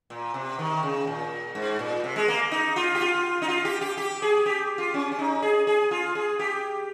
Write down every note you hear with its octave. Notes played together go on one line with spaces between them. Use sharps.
A#2
C3
D#3
C#3
A#2
G#2
A#2
C3
G#3
A#3
D#4
F4
G4
F4
D#4
F4
G4
G4
G4
G#4
G4
F4
C#4
C#4
D#4
G#4
G#4
F4
G#4
G4